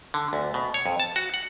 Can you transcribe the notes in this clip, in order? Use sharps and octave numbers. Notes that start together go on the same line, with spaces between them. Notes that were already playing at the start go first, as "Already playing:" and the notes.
D3
D2
B2
C#5
F2
A5
F#4
F#5